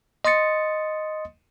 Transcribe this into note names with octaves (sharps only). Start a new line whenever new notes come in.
D#5 C6 D#6 A6 C#7